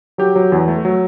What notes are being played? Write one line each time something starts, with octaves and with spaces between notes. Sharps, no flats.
F#3 G4
F#3
E2
A3
F#3